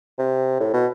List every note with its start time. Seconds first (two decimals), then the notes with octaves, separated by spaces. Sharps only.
0.19 C3
0.60 A2
0.74 B2